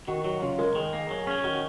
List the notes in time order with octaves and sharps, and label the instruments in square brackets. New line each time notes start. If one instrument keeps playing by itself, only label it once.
[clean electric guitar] D#3 [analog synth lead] F#4
[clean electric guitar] F#3 [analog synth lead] F#4
[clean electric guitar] C#3 [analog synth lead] F4
[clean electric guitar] G#3 [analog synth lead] A#4
[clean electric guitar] D#3 [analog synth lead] G#4
[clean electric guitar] A#3
F#3
C#4
[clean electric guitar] D#3 [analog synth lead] F#4